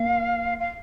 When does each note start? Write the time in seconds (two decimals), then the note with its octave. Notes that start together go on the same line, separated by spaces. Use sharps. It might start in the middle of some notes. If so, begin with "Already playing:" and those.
Already playing: A#3 F5
0.60 F5